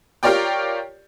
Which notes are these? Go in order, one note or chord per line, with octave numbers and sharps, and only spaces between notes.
F4 G4 A#4 C#5 D5 G5